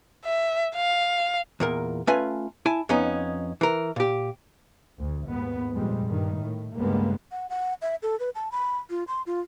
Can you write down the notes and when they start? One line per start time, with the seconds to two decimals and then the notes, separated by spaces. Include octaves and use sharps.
0.25 E5
0.76 F5
1.60 E2 A#2 A#4
2.07 A3 C#4 F4 B4 G#5
2.66 E4 G#5 A5
2.89 F2 B3 C#4 D#4
3.61 E3 A#4
3.96 A#2 G4
4.99 D2
5.28 D#2 G#2 B3
5.74 F2 A#2 G3 G#3
6.07 G2 D#3
6.40 A2
6.77 C#2 G2 G3 G#3 A#3 B3
7.31 F#5
7.50 F#5
7.82 E5
8.03 A4
8.20 B4
8.35 A5
8.52 B5
8.90 F4
9.08 C6
9.27 F4